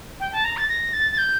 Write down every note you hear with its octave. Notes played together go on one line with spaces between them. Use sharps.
G5
A5
A#5
A6
A#6
A6
A6
G6